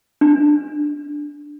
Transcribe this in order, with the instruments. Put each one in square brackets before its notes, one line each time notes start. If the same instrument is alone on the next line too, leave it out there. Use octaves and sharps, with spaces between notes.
[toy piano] D4